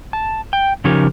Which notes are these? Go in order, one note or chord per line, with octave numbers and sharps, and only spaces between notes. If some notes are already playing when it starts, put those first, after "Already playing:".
A5
G5
C#3 F3 C#4 D#4 G4 A#4